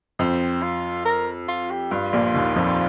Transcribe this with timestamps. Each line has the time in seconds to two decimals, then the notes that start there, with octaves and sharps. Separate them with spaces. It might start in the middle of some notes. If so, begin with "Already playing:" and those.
0.19 F2 C4
0.63 F4
1.05 A#4
1.48 F4
1.71 G4
1.91 G2 F4
2.13 A#1 A#2
2.34 D#2 D#3
2.56 F2 F3